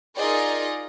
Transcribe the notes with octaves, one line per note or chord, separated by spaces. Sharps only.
D#4 F4 G#4 A#4 D5 D#5